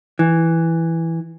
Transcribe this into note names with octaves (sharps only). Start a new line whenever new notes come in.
E3